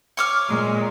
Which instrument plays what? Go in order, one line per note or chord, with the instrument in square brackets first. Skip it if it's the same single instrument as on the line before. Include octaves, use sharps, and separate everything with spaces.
[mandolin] C#5 D6 F6
[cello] A#2 G#3